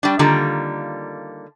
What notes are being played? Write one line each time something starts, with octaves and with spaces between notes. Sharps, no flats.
G3 D4
D3 D#3 G3 A#3 F4